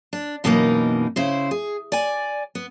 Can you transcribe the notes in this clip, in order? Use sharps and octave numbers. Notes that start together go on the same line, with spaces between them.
D4
F#2 B2 E3 A#3 C4 D#4
C#3 E4 C5
G#4
D5 G#5
B3